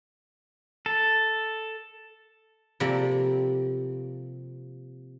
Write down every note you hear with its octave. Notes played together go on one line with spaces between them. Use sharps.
A4
C3 F3 G3 A#3 C4 A4